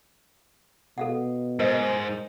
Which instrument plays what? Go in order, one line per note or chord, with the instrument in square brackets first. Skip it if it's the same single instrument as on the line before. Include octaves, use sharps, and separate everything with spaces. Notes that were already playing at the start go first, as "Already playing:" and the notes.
[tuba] B2 [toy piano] A4 F5 F#5
[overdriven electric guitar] G#2 [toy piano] A#4 C5 D#5